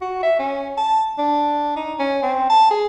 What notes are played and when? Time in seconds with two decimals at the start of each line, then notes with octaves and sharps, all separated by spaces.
0.01 F#4
0.23 E5
0.39 C#4
0.78 A5
1.18 D4
1.76 D#4
2.00 C#4
2.23 C4
2.50 A5
2.71 G#4